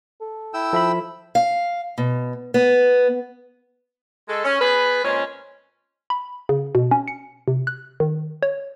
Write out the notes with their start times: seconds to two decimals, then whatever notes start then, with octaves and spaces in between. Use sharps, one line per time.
0.21 A4
0.54 E4 G5 E6
0.73 F3 A4 E5 B5
1.35 F5
1.98 B2
2.54 B3
4.28 G#3 A4
4.44 C#4
4.60 B3 G#4 B4
5.04 A#2 G#3 C4 C#4
6.10 B5
6.49 C#3
6.75 B2
6.91 C#4
7.08 C#7
7.48 C3
7.67 F#6
8.00 D#3
8.43 C#5